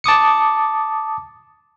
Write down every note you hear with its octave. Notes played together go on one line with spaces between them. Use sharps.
A5 D6 D#6 C#7